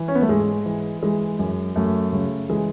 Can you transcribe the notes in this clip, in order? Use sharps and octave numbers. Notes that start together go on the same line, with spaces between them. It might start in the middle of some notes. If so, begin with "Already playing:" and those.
Already playing: E3
C#4
B3
A3
G#2 G#3
E3
E3 G#3
F#2
F#2 A3
C#3
E3 G#3